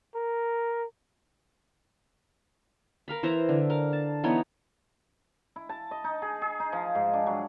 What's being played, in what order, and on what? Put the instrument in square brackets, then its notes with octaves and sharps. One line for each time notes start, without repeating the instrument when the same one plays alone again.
[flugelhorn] A#4
[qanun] A#4 F5 B5
E3 C5 E5 A#5
D3
A#4 F5
A5
E3 B3 D#4 C#5
[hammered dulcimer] E4
A5
D#5
D#4
G#4
G#4
D#4
F3
G#2
D4
F#3